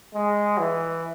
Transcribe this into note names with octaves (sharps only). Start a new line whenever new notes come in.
G#3
E3